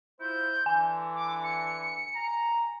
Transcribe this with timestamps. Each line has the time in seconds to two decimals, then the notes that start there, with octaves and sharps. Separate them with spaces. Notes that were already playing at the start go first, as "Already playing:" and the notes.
0.20 E4 F4 C5 G6
0.66 D3 E3 G#5
1.15 D6
1.43 C#7
2.16 A#5